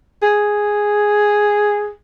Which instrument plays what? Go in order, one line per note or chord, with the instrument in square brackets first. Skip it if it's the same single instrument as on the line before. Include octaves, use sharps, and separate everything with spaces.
[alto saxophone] G#4